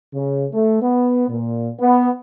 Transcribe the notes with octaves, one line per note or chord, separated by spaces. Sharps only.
C#3
A3
B3
A#2
B3